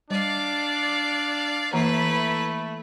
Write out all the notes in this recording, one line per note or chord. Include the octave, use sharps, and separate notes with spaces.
G3 D4 D5 F5
E3 A3 A#3 E4 B4 A#5